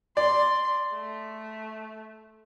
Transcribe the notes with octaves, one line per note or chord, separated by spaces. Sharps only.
D5 C6
A3